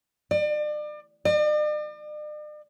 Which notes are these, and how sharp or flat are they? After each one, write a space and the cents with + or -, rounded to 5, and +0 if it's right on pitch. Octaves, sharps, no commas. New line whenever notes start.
D5 +35
D5 +45